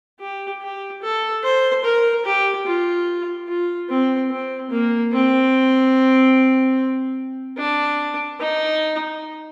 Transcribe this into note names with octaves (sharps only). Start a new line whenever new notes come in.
G4
G4
A4
C5
A#4
G4
F4
F4
C4
C4
A#3
C4
D4
D#4